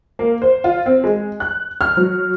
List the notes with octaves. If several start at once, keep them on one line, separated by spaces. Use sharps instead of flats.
A#3
C5
F4
C4
G#3
F#6
F6
F#3